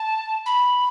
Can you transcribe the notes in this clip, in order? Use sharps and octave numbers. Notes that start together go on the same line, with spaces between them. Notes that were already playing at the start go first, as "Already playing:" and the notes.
Already playing: A5
B5